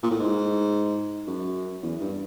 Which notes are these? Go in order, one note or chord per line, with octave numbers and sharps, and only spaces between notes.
A#2
A2
G#2
F#2
E2
G2